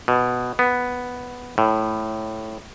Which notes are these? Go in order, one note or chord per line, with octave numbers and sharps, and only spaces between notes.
B2
B3
A2